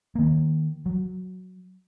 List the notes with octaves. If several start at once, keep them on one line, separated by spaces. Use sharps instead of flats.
D#3 A#3
F#3